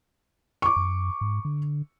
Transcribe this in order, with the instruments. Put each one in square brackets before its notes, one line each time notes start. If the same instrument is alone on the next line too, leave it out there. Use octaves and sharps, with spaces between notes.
[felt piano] C#6 D6
[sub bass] F#2
G#2
D3